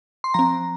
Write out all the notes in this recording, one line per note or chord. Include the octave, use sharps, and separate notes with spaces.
C6
F3 C4 A#5